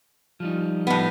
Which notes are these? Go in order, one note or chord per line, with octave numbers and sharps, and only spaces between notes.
F3 G3 D#4
A2 B3